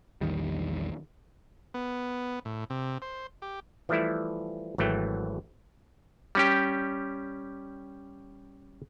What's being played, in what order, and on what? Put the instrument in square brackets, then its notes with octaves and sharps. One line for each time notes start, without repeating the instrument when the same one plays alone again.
[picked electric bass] A#1 E2 D#3 G3
[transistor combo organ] B3
A2
C3
C5
G4
[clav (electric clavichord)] E3 F3 G3 A3 E4
G#1 E3 F#3 A3 G5
G3 C#4 G4